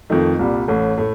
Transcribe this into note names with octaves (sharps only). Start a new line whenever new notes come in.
F2 D#3 A3 D#4
C2 A#2 G3
A1 A2 A3
A2 A3